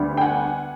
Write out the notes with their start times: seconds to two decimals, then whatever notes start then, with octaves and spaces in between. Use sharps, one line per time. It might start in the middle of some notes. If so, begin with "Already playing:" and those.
Already playing: D2 D3 G3 B3
0.17 G5
0.21 F#5 G#5